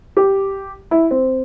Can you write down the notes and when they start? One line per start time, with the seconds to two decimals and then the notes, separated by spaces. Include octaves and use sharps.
0.17 G4
0.91 E4
1.11 C4